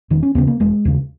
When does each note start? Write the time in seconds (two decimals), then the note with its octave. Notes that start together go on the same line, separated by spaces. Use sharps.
0.10 E1 D#3
0.23 C#4
0.35 D#2 C#3 B3
0.47 A#3
0.60 E1 G#3
0.85 D#2 C#3